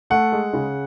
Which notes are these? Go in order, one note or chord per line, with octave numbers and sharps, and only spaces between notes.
A3 F#5
G#3
C#3